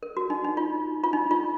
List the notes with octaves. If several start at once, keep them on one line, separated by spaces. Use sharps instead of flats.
A#4
F#4
D#4
D#4
F4
F4
D#4
F4